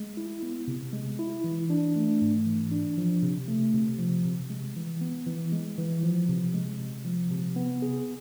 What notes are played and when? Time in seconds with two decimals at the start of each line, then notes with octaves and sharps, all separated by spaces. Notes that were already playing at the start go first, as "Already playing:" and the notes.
Already playing: G#3
0.17 E4
0.43 B3
0.68 C3
0.93 G#3
1.19 E4
1.44 E3
1.70 D4
1.96 A3
2.21 G#2
2.46 E3
2.72 D4
2.98 F3
3.23 C3
3.48 A3
3.74 C3
3.99 F3
4.25 C3
4.50 G#3
4.76 E3
5.01 B3
5.27 E3
5.52 G#3
5.78 E3
6.03 F3
6.28 C3
6.54 G#3
6.80 C3
7.05 F3
7.31 C3
7.56 B3
7.82 G#4